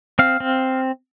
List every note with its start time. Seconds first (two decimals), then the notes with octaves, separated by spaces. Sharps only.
0.19 C4 F5
0.40 C4